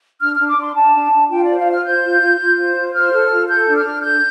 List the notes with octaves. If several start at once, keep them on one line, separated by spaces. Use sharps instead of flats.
D4 F6
D4 F6
D6
D4
C6
D4 A5
D4
D4
F4 G5
C5 D5
F5
F4
F6
C5 G6
F4
F4
F4
C5
F4
C5 F6
A4
F4
A4 G6
D4
F6
D4
A4 G6